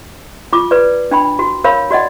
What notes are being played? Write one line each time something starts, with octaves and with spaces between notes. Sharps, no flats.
F4 D6
B4 D5
D4 G5 B5
F#4
A#4 C#5 F5 B5
F#4 D5 D#5 F#5